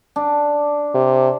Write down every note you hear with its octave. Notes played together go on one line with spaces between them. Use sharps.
D4
C3